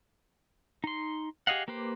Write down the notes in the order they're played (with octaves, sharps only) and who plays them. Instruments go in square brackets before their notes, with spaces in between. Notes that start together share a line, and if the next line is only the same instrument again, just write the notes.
[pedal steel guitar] D#4 C6
G4 G#4 D#5 F5 F#5
A#3 G4 B4 C5